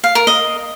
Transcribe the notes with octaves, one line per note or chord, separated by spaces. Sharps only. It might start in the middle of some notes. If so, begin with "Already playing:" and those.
F5
A#4
D#5